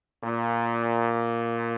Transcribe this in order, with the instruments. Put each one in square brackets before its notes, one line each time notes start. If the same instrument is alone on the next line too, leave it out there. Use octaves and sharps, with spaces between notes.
[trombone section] A#2